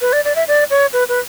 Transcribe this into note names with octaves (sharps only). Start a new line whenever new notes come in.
B4
D5
D5
E5
D5
C#5
B4
B4